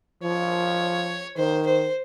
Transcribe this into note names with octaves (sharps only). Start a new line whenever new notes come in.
F3 C#5
D#3 C5
C5